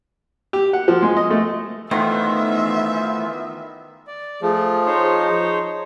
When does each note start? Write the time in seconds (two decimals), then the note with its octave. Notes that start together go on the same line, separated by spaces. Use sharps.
0.53 G4
0.73 F#5
0.88 F3
1.02 G#3
1.17 D#5
1.30 A3
1.91 D#3 E3 A3 B3 F4 C5 E5
4.07 D5
4.42 F3 A3 G#4
4.86 D#4 C5 C#5